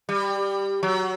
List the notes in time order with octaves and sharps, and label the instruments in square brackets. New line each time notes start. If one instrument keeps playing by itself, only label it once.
[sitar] G3
F#3